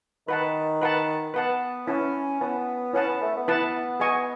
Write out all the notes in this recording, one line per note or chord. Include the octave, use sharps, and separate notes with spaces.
D#3 B4 F#5 A5
B4 F#5 A5
B3 B4 F#5 A5
C#4 E4 B4 F#5 A5
B3 E4 B4 F#5 A5
C#4 E4 B4 F#5 A5
B3
A3
B3
E4 B4 F#5 A5
G#4 D#5 G#5 C#6